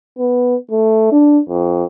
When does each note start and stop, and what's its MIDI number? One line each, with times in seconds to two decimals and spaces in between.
0.18 0.56 59
0.71 1.07 57
1.12 1.39 62
1.49 1.84 41